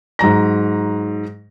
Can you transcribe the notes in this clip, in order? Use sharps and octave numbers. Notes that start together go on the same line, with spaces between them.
G#2 F#3 A#5 A#6